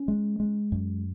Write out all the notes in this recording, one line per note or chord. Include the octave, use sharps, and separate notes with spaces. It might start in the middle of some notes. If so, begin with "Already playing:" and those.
Already playing: C#4
G#3
G#3
F#2